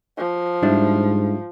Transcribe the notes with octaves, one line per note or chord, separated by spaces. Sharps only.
F3
G#2 G3 D4 E4